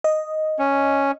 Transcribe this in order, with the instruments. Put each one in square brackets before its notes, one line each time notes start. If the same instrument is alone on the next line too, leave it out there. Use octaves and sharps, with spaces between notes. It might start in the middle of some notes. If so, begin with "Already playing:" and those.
[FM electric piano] D#5
[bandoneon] C#4